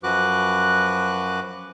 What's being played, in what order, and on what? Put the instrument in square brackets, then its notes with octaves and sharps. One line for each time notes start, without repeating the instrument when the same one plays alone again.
[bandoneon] F#2 F3 F#4 B4 D6 F#6